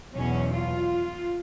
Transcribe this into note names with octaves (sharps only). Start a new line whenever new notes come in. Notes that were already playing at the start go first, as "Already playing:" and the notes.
E2 B2 F#3 C#4
F4